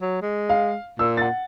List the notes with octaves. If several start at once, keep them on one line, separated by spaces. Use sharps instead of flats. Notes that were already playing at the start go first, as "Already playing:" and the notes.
F#3
G#3
F5
A#2 E6
F#5 A6